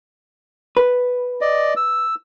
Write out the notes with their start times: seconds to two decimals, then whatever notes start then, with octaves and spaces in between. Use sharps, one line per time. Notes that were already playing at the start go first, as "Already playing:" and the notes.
0.77 B4
1.41 D5 D#5
1.76 E6